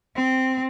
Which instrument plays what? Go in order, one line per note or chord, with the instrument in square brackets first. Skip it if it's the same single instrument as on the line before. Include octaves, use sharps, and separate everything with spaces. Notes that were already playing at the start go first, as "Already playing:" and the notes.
[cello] C4